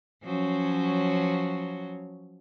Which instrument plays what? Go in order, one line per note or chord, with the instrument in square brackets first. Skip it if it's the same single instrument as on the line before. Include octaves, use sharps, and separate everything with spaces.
[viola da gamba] F3 F#3 C#4